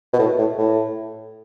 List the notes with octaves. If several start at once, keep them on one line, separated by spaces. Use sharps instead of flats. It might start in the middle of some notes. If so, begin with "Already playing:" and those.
B2
A2
A2
A2